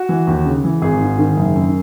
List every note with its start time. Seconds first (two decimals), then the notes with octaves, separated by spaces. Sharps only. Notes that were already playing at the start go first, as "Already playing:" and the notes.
Already playing: F#4
0.09 E3
0.27 D#2
0.45 C#3
0.64 E3
0.82 G#1 G#4
1.01 G#2
1.18 D#3
1.37 F#1
1.56 F#2